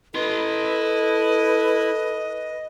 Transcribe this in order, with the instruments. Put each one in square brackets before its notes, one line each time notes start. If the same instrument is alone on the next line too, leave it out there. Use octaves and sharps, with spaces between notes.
[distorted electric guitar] E4 C6 [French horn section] A4 [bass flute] B4 [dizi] D#5